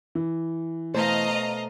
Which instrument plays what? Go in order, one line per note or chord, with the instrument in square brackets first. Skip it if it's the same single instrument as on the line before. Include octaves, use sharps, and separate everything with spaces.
[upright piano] E3
[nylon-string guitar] B2 A3 C5 [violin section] D#5 F5 A#5